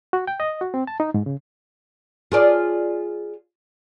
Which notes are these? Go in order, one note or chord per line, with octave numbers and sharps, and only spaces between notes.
F#4
G5
D#5
F#4
C4
A5
D#4
G#2
C#3
F4 G#4 D5